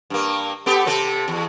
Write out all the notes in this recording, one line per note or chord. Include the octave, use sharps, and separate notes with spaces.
G2 A#3
B3 G4 A4
C3 C4 A4
E2